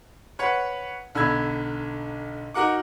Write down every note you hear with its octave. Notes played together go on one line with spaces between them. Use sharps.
B4 C#5 F#5
B1 D3 B5 E6 G#6
D#4 F#4 A#4 F#5 D6